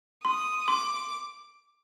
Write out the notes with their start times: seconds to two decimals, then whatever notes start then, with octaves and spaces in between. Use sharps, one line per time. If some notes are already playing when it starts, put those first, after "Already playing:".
0.24 C6 D#6
0.68 C6 D6